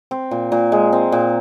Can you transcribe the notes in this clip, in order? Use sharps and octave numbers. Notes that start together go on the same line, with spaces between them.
C4
A#2
A#2
G#3
C4
A#2